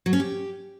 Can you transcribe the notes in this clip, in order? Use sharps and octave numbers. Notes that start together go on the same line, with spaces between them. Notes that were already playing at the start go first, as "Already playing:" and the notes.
F#3
C#4
G4